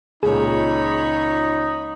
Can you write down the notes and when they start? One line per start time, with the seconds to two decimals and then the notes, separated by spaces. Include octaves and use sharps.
0.23 C#2 A#2 D#4 G#4 C#5 B5